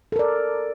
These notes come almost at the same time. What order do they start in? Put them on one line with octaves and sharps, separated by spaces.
A4 A#4 D5